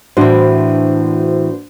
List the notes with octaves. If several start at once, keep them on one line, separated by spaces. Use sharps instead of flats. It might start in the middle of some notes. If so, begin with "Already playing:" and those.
A2 E3 D4 F#4 C5